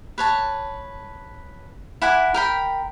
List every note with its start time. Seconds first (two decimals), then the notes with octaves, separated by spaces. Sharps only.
0.18 B4 C#5 A5
2.02 E4 F#5 G#5 D6
2.34 A#4 G5 B5